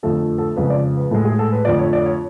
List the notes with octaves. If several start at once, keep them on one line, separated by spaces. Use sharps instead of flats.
F2 D3 F3 A3 A4
A4
F2 C#3 G#3 B4
D5
B4
A2 G#3 A4
G#4
A4
B4
F2 D3 F3 A3 D5
C#5
D5
C#5